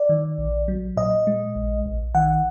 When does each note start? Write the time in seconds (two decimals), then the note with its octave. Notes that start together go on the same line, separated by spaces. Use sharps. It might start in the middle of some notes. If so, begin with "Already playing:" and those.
Already playing: D5
0.09 D#3
0.38 A#1
0.68 F#3
0.97 A#2 D#5
1.27 G#3
1.56 A#1
1.86 A#1
2.15 D#3 F#5